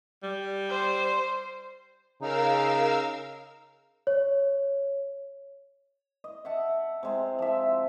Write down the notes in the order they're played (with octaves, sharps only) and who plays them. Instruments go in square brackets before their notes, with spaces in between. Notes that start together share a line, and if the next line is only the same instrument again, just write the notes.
[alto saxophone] G3
[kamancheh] C5
[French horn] C#3 [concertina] D#4 [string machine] A#4 F5 E6
[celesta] C#5
[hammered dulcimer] D#5
E5 F#5 A5
C3 G#3 C4
F3 E5